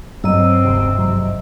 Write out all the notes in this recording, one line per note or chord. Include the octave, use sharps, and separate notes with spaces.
G2 F#3 C4 D#5 E6
E1 D2 C3
G#1 C3 F#3